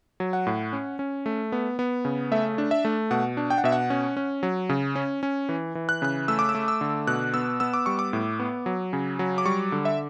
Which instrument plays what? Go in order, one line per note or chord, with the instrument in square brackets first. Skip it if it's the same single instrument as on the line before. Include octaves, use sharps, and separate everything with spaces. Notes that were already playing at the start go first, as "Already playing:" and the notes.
[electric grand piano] F#3
F#5
A2
C#4
C#4
A3
B3
B3
C#3
A3 E5
D4
E5
A3
B2 F#5
D4
G5
F#5
B2 E5
F#5
C#4
C#4
F#3
C#3
C#4
C#4
E3
E3
F#6
C#3 F#6
A3 E6
D6
E6
A3
E6
D3
B2 F#6
B3 E6
B3 E6
D6
G3 C#6
D6
A2
B3
F#3
C#3
F#3
D6
G3 C#6
D3
E5